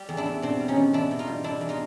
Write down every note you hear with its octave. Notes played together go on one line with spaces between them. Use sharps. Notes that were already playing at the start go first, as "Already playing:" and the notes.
Already playing: G3 G4
E2
D4 E4
E2
B2 C4 D4
G3
C#4 D#4
E2
E2 D4 E4
B2
D#4 F4
G3
E2 D4 E4
E2
D#4 F4